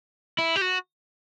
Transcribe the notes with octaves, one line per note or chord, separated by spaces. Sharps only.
E4
G4
F#4